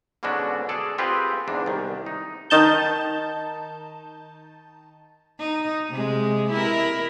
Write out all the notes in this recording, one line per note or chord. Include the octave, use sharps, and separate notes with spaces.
G#2 B2 D3 C#4 D4 F#4
G#4 A4 D5
C4 F4 G4 G#4 B4
E2 G#2 D4
C2 D#3
D#4
D#3 D#4 A5 G6
D#4
C3 G#3
E4 A#4